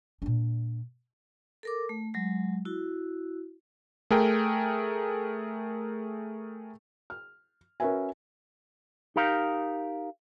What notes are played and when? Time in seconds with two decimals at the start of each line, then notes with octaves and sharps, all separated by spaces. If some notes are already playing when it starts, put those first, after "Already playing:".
0.22 A#2 D4
1.63 A4 A#4 D6
1.89 A3
2.14 F#3 G#3
2.65 E4 F#4
4.11 A3 G#4 A#4 G5
7.10 F6
7.80 C#4 F#4 A#4 B4 E5 G#5
9.16 D#4 G4 A#4 F5